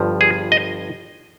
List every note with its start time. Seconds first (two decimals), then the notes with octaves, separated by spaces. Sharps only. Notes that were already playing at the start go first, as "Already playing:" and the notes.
Already playing: G1 G2 F3
0.21 G#4
0.52 D#5